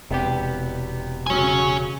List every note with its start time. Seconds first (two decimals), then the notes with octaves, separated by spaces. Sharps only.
0.11 E1 C3 B3 G4
1.26 C#3 F#3 C#5 G#5